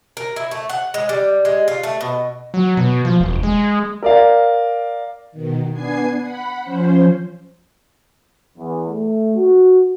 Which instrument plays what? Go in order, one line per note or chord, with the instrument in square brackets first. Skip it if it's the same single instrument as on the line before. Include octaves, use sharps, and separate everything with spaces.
[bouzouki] A#4
E4
A3
F#5
G#3
G3
G#3
F4
A3
B2
[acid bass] F#3
B2
F3
E1
G#3
[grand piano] A#4 D5 F5
[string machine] B2 D#3
B3 D4 G#5 G#6 C7
F#5 B5
F3 C#4 C5
[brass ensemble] E2
A3
F#4